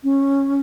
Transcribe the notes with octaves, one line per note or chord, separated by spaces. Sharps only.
C#4